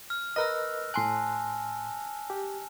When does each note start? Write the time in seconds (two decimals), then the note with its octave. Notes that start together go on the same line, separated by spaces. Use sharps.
0.10 F6
0.36 A#4 B4 D#5 E6 F#6 A#6
0.94 A2 G#5 A5 C6 F#6
2.30 G4